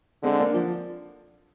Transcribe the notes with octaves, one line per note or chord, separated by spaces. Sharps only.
D3 G#3 C4
A#3 D4
F3